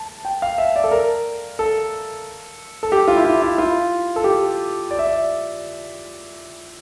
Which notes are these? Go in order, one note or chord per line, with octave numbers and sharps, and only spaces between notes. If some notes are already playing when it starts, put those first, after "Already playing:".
Already playing: A5
G5
F5
E5
D5
A4
A#4
A4
A4
G4
F4
E4
F4
E4
F4
A4
G4
D5
E5
D5